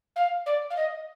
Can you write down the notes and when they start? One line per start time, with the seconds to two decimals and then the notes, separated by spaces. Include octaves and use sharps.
0.16 F5
0.46 D5
0.70 F5
0.77 D#5